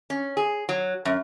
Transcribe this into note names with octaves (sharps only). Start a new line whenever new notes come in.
C#4
G#4
F#3
F#2